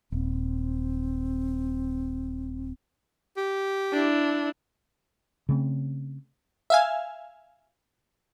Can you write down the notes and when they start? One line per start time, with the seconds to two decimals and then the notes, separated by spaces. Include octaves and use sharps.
0.12 D#1 C4
3.37 G4
3.93 D4 E4
5.49 C#3 A3 C4
6.70 E5 F5 G#5